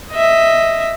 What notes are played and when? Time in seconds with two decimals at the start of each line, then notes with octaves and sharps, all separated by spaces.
0.11 D#5 E5